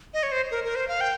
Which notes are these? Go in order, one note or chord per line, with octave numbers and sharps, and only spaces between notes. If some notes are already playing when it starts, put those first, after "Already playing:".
D#5
C#5
C5
A#4
A#4
C5
F5
G5